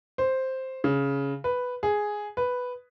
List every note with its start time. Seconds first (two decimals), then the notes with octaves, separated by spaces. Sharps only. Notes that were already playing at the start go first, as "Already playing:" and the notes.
0.18 C5
0.84 C#3
1.44 B4
1.83 G#4
2.37 B4